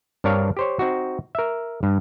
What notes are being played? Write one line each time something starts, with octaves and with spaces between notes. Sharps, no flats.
G2 C4 D4 A#4 C#5 F5
G4 C5 C#5
C4 D#4 F#4
A#4 E5
G2